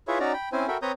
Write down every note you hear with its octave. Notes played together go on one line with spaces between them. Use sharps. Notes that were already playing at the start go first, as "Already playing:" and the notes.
E4 F4 G#4 B4 C#5 E5
C#4 D#4 F#4 D5 A#5
G5 B5
C4 C#4 E4 C5 G#5
F#4 A4 A#4 E5 G5 B5
C4 B4 C#5 A#5 D#6 G6